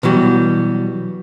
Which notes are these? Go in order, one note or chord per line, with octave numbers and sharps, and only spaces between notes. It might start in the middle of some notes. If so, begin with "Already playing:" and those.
B2 E3 F#3 G3